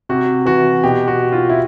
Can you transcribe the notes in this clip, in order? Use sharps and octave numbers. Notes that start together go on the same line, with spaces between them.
C3 F#4
E3 F#4
B2 G4
F#4
F4
E4